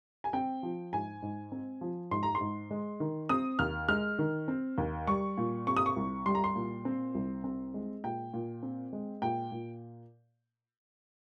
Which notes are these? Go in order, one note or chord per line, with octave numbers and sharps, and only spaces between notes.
G#5
C4 G5
F3
G#2 G#5
G#2
C4
F3
G#2 C6
A#5
C6
G#2
G#3
D#3
C4 D#6
D#2 F6
G#3 F6
D#3
C4
D#2
G3 C#6
A#2
C4 C#6
D#6
C#6
C2
G3 C6
A#5
C6
A#2
C4
C2
C4
G#3
A#2 G5
A#2
C4
G#3
A#2 G5
A#2